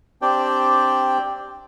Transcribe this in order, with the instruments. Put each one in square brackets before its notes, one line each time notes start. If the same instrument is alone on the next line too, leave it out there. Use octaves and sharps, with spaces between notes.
[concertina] C4 D4 G4 D5 G5